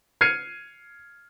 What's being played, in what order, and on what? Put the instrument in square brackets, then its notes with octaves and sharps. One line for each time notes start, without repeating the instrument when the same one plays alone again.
[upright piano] F6 G#6 C7 C#7 D#7